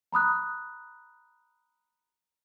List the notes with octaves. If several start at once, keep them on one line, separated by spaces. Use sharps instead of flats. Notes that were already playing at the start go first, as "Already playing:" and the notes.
A#5 B5 D#6 F#6